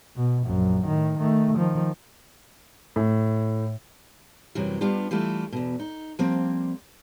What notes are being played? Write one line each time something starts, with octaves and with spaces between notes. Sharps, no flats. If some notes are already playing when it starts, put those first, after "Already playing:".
B2
A#1 F#2
A2 D#3
D#3 A3
D#3 F3
A2
F#2 C3 E3 F#3 G3
G3 B3 D4 F4 G4
E3 G3 A3 E4 F4
E2 B2
D#4
F3 G3 A#3 C4